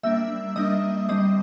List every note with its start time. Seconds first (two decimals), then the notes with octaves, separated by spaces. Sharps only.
0.03 G3 A#3 D4 E5 E6
0.56 G3 A#3 D4 D#5 D#6
1.09 D3 G3 C4 D#5 D#6